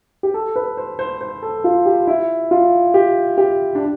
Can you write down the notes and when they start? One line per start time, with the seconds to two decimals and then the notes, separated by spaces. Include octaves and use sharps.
0.23 G4
0.34 A4
0.56 B4
0.77 C5
0.99 C5
1.21 C5
1.43 A4
1.64 F4
1.86 G4
2.07 E4
2.51 F4
2.94 G4
3.38 G4
3.75 D4